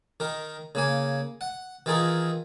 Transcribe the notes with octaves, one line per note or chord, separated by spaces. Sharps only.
D#3 A#4
C#3 A#3 G#5
F#5
D#3 E3 F4 G#4 A#4